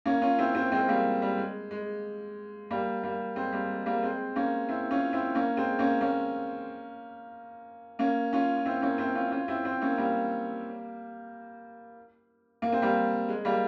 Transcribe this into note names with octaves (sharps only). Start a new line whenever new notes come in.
A#3 C#4
C#4 F4
C4 E4
C4 E4
G#3 C4
G3 A#3
G3
G#3
G#3
G3 A#3
G3 A#3
G#3 C4
G3 A#3
G#3
G3 A#3
G#3 C4
A#3 C#4
C4 E4
C#4 F4
C4 E4
A#3 C#4
G#3 C4
A#3 C#4
A#3 C#4
A#3 C#4
C#4 F4
F4
C4 E4
A#3 C#4
C4 E4
C#4 F4
C#4 F4
C4 E4
C4 E4
A#3 C#4
G3 A#3
A#3
C4
G3 A#3
G#3
G3 A#3